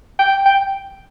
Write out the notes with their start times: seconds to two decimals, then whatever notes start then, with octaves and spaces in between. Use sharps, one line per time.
0.19 G5
0.46 G5